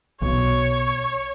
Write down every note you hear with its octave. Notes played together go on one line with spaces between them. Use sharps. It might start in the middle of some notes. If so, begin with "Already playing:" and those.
B1 B2 C#5